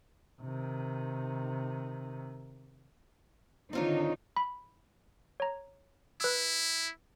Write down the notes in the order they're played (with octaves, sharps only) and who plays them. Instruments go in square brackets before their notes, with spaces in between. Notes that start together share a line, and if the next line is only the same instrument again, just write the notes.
[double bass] C3 D#3
[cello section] D3 D#3 D#4 [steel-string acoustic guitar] C4 F4 C#5
[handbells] B5
C#5 A#5
[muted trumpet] E4 [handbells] B4 E6